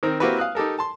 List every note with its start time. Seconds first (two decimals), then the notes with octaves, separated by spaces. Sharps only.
0.03 D#3 C4 A#4
0.20 A#3 C4 E4 F#4 G4 B4
0.38 F5 D#6 F#6
0.55 D#4 G4 A4 A#4
0.79 A5 C6